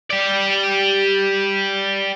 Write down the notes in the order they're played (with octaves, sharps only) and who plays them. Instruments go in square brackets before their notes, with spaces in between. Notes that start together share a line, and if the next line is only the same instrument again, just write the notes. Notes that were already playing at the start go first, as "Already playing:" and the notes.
[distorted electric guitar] G4 D5